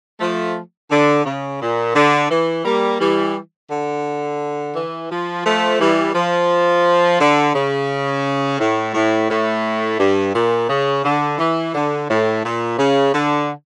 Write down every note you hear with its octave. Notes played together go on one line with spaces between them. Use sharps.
F3 A3
D3
C#3
A#2
D3
E3
G3 A#3
E3 G3
D3
E3
F3
F3 A3
E3 G3
F3
D3
C#3
A2
A2
A2
G2
A#2
C#3
D3
E3
D3
A2
A#2
C#3
D3